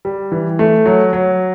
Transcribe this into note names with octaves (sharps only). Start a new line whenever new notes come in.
G3
E3
A3
F#3
F#3